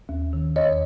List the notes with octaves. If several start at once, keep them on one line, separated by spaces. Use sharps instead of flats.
D#2
D#3
E2 C#5 D#5